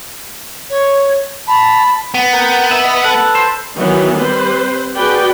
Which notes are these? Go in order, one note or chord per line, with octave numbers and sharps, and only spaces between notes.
C#5
A5 B5
B3
A#4 F#5 G5
E5
B4 D#5
A4 B4 F#5
C5
D#3 E3 F#3 B3 D#4
G3 C4 B4 C5
F#4 G#4 B4 D5 G5